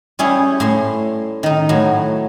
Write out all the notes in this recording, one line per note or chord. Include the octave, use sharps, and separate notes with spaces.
G3 C#4 E4 G#4 C#5
A2 C6
D#3 D#4
A2 F#3